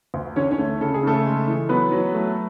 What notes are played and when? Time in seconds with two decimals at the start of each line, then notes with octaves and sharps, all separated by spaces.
0.14 D2
0.36 D3 C#4 C#5
0.51 C#4 C#5
0.58 A3
0.81 C#3 A4
0.94 G#4
1.03 C#3 A3 A4
1.25 G#3
1.47 E3
1.69 F#3 B3 B4
1.92 F#3
2.14 A3